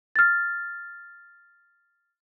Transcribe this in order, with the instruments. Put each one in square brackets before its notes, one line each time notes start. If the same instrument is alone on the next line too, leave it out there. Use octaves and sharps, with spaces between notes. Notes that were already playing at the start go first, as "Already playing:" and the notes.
[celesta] F6 A6